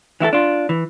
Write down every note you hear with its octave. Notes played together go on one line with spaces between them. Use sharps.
E3 E4 F#4 A4
D4 F4
E3